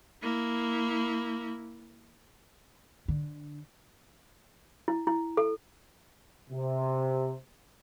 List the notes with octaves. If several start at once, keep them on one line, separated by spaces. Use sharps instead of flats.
A#3 E4
D3
E4
E4
A4
C3